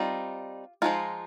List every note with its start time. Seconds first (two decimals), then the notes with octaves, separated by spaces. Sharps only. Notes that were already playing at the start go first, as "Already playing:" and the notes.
Already playing: G3 C4 D#4 F4
0.82 F3 G#3 D#4 F4